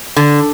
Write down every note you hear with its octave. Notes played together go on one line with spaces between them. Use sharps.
D3